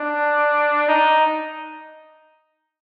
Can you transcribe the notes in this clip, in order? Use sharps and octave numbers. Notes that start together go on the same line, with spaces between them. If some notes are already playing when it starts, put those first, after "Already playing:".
Already playing: D4
D#4